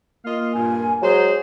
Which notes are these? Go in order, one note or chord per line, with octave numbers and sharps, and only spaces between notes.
A#3 F4 D#5 F5
G2 A#2 G#5
F#3 G#3 G#4 C5